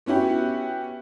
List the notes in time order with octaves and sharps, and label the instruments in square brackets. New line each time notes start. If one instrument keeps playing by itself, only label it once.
[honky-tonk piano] B3 C#4 E4 F#4 G4